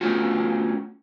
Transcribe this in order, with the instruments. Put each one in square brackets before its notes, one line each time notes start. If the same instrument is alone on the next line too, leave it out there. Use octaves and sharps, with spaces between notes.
[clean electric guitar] A3 B3 C#4 F4 F#4